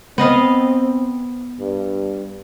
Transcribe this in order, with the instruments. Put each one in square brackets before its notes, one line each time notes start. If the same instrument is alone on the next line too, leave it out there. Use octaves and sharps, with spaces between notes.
[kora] B3 D#5 F5 [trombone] C4
[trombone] G2